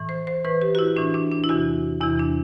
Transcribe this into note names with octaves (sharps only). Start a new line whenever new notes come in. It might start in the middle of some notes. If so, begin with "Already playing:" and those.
Already playing: A2 E3
C5
C5
A2 E3 B4
G4
F#4
E4
A2 E3 D4
D4
D4
E4
E2 C3 E3 F#4
E2 C3 E3 E4
D4